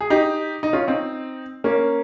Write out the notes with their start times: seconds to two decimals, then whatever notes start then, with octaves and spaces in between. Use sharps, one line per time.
0.01 G#4
0.10 D#4 G4
0.63 D#4
0.73 C#4 F4
0.87 C4 D#4
1.64 A#3 C#4